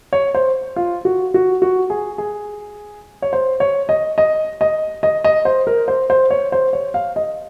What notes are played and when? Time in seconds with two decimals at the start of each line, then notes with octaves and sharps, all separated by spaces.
0.13 C#5
0.35 C5
0.76 F4
1.05 F#4
1.34 F#4
1.62 F#4
1.90 G#4
2.18 G#4
3.22 C#5
3.33 C5
3.60 C#5
3.89 D#5
4.18 D#5
4.61 D#5
5.03 D#5
5.24 D#5
5.45 C5
5.67 A#4
5.88 C5
6.10 C5
6.30 C#5
6.52 C5
6.73 C#5
6.94 F5
7.16 D#5